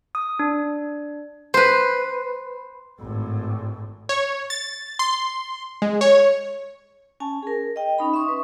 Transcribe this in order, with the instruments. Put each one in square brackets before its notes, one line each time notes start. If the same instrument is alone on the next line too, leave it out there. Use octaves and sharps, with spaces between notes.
[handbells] D#6
D4
[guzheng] B4 C5
[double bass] G#1 A2
[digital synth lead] C#5
A6
C6
G#3
C#5
[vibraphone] C#4 G#5 A5
G#4 A#4
D#5 G5
C#4 D#4 B5
E5 C6 C#6 D#6
B4